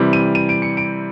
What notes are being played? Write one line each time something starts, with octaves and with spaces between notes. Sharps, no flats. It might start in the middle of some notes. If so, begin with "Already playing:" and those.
Already playing: C3 E3 G3
D#7
D#7
D7
C#7
D7